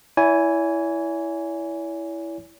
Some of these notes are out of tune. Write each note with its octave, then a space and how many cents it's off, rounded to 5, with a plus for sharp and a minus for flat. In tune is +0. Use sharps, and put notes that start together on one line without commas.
E4 +0 C#5 +45 G#5 +0